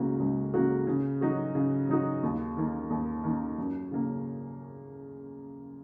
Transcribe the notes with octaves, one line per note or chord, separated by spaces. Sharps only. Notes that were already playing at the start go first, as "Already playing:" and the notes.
Already playing: C#2 C#3 A#3 F#4
C#2
C#3 A#3 F#4
C#3
F#3 D#4 F#4
C#3
F#3 D#4 F#4
D#2
D#3 A#3
D#2
D#3 A#3
F#2
C#3 A#3 C#4